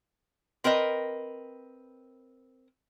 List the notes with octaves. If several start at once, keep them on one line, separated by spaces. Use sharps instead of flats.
C4 A#4 B4 D#5